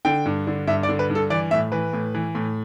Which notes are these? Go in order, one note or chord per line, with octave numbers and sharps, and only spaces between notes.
D3 G5
G2
D3
G2 E5
D5
D3
B4
G2
A4
E3 D5
A2 E5
E3 B4
A2
E3
A2